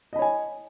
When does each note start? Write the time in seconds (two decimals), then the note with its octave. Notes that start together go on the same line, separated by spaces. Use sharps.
0.13 D#5
0.16 B5
0.19 C#5
0.22 G#5